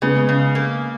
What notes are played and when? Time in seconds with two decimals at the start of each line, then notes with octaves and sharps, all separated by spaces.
0.02 C#3 G#3 B3
0.29 C#3
0.55 A#3